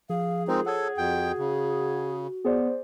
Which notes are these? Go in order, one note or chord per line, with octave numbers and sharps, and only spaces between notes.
F3 G#4 F5
G#3 C4 D#4 F4 A#4 C5
A4 C#5 F#5 D#6 G#6
F2 F#4 G5
C#3
B3 G#4 C5 D5